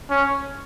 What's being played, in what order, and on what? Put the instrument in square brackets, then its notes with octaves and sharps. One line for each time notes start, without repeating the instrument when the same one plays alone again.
[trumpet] C#4